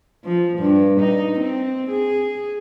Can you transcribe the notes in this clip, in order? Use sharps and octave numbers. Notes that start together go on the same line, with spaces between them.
F3
G2
D#4
C4
G#4